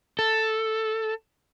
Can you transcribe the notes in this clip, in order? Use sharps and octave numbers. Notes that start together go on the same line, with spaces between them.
A4